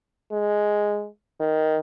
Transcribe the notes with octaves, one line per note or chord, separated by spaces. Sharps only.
G#3
D#3